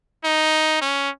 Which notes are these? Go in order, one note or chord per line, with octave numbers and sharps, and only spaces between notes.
D#4
C#4